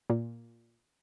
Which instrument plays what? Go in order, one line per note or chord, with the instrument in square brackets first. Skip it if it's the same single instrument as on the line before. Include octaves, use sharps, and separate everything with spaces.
[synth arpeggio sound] A#2